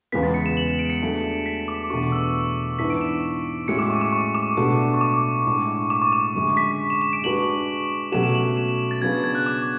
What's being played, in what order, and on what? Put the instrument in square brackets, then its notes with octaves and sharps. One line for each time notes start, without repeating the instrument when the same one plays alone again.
[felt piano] E2 C#3 G#3 B3 [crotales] B6
[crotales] A6
C#7
E7
F#7
E7
D7
C#7
[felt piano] F#3 A3 D4 G#4
[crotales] B6
D6
[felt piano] E2 B2 A3 D4 F#4 [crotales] C#6
[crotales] E6
[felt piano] G#2 E3 B3 D4 [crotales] B6
[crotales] D7
E7
[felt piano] A2 G#3 C#4 F#4 [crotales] C#7
[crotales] D6
C#6
D6
C#6
D6
[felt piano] B2 A3 D4 F#4
[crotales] C#6
D6
[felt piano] A2 G#3 D4
[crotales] D6
C#6
D6
[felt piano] F#2 D3 G#3
[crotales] B6
E7
E7
D7
[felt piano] G#3 D4 F#4 B4 [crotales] F#7
[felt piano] B2 F#3 A3 C#4 F#4 [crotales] E7
[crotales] E7
F#7
E7
E7
A6
[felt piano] C#3 F#3 B3 D4 G#4 [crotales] G#6
[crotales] A6
G#6
F#6
D6